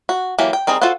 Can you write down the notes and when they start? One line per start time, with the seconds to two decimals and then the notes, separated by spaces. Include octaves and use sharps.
0.09 F#4
0.38 E3 F#3 A#3 G4
0.53 G5
0.67 G3 C4 D#4 G#4 A#4
0.82 F4 F#4 A4 C5 F#5